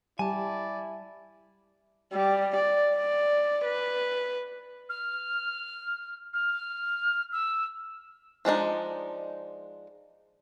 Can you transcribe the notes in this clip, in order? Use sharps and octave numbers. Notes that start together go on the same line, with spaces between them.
G3 E4 D5 G#5 A5
G3
D5
D5
B4
F6
F6
E6
F3 G#3 D4 D#4